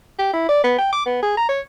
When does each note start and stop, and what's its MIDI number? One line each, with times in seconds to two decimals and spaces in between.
0.19 0.32 67
0.34 0.47 64
0.49 0.62 74
0.64 0.75 59
0.78 0.91 79
0.92 1.03 86
1.06 1.19 59
1.23 1.35 68
1.37 1.47 82
1.49 1.61 73